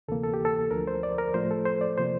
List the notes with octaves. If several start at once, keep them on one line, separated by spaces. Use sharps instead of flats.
D2 C3 E3 A#3 A4
A4
G4
A4
D2 D3 F3 A#4
C5
D5
A#4
A2 F3 A3 C5
A4
C5
D5
C3 F3 A#3 C5